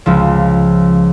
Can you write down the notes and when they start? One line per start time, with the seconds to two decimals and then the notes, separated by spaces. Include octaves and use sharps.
0.06 C#2 F3